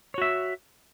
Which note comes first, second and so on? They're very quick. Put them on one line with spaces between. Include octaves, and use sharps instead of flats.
C#5 F#4 E5